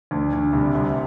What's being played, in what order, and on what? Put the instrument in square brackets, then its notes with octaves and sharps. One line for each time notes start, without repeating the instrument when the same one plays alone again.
[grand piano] D2
D2
[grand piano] C2 [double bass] C3
[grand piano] C2